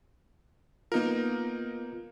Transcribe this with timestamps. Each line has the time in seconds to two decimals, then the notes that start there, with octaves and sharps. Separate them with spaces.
0.92 A#3 B3 D#4 F4 A#4